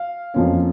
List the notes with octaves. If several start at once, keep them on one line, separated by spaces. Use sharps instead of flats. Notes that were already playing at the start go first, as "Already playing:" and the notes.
Already playing: F5
F2 F3 A#3 C#4